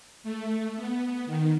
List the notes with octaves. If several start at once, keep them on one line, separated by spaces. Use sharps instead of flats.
A3
B3
D#3